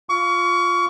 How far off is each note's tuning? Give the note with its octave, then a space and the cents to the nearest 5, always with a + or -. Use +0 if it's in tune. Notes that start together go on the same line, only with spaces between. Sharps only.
F4 +0 C#6 +30